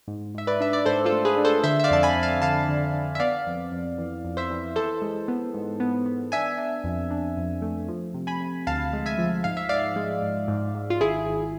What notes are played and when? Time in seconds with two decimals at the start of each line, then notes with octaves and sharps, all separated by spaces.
0.08 G#2
0.35 G#2 E5
0.47 B4 D5
0.60 D4 E5
0.73 D5
0.86 G#2 A4 C5
1.06 F4 A4
1.12 A3
1.25 G#4 B4
1.38 D4
1.45 A4 C5
1.64 D3 C5 E5
1.80 E5
1.84 D5 F5
1.91 F2 A5
2.03 G#5 B5
2.16 F2
2.23 F5 A5
2.42 D3 F5 A5
2.69 D3
2.94 D3
3.15 E5
3.20 B3 D5 F5
3.47 F2
3.72 F2
3.98 E3
4.25 F2
4.37 C5 E5
4.50 E3
4.76 E3 A4 C5
5.02 G#3
5.28 B3
5.54 G#2
5.80 B3
6.06 B3
6.32 D4 E5 G#5
6.58 D4
6.84 F2
7.11 D4
7.37 F2
7.62 A3
7.88 F3
8.14 C3
8.27 G#5 B5
8.41 C3
8.67 D2 F5 A5
8.93 G#3
9.06 E5 G#5
9.18 F3
9.44 G#2 F5
9.57 E5
9.69 G#2 D5 F5
9.96 G#3
10.22 G#2
10.48 G#2
10.74 G#2
10.90 F4
11.01 G#1 E4 G#4
11.26 G#1